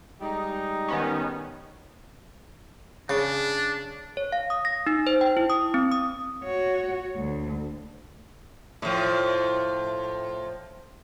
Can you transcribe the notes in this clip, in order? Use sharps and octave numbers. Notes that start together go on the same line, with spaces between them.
G3 G#3 D#4
D#3 B3 C#4
C#3 D4
C#5
F5
D#6
A#6
D#4
C5
G5
E4
D#6
C4
D#6
F#4 C#5
D2
A2 F3